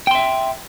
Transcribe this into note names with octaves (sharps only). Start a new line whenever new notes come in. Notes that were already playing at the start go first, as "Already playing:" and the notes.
E5 G5 C6